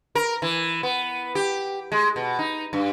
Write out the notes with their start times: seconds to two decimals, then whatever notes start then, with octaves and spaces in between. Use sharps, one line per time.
0.15 A#4
0.42 E3
0.83 B3
1.35 G4
1.92 G#3
2.16 B2
2.39 D#4
2.73 G2